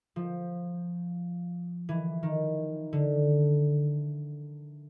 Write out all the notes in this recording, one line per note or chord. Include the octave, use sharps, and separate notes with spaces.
F3
E3
D#3
D3